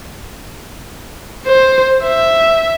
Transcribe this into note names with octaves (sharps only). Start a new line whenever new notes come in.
C5
E5